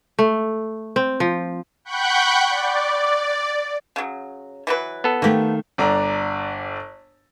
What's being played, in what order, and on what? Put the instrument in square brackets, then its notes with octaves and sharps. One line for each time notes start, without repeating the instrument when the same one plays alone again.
[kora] A3
C4
F3
[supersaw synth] F#5 G5 B5 C#6 F#6 G6
D5
[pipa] C#3 F#3
E3 F#3 B4
[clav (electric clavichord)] B3 A4
[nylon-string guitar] D#3 A3 [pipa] A#3 G4
[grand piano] G1 D4 A#5